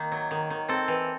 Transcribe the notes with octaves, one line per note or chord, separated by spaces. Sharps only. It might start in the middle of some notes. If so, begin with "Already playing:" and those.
Already playing: D#3 A#3
F#3
D#3
D#3
C4 A4
E3